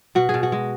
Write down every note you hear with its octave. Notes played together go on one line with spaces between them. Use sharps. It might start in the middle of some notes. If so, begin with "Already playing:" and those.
B2 F#4
G#4
B2
F#4
G#3